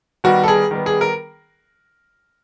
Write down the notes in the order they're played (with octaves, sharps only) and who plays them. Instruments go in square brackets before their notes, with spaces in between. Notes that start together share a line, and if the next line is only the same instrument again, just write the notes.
[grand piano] D#3 G3 B3 F#4
A4
G#4
D#3 G3 B3
G#4
A#4